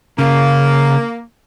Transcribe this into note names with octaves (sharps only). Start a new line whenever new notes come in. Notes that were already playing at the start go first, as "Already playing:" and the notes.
C#3 A#3